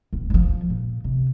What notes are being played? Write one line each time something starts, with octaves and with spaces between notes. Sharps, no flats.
D1
E3 F3
A#2
C3